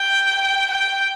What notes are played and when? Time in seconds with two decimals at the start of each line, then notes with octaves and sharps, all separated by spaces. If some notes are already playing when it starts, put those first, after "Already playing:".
Already playing: G5
0.70 G5